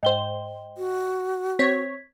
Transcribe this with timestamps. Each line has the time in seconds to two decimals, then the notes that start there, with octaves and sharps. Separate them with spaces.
0.03 G#2 C5 D#5 G5 G7
0.78 F#4
1.59 C4 C#5 G#6 B6